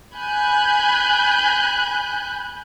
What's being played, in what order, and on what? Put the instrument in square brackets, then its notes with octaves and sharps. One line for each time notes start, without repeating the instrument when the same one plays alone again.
[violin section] G#5 B5 F#6 G6